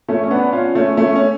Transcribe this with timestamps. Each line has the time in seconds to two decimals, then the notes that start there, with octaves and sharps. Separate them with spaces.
0.08 A3 C#4
0.23 C#4
0.31 B3 D4
0.53 C#4 F4
0.75 A3 C#4
0.97 A3 C#4
1.16 C#4